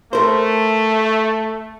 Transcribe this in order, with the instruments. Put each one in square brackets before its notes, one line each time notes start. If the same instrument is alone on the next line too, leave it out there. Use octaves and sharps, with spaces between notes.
[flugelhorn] A3 [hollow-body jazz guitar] A#4 C5